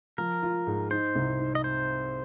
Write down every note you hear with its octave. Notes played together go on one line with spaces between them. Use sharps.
F3 A#4
F4
G#2
D#4 C5
C2
D#4
D#5
C5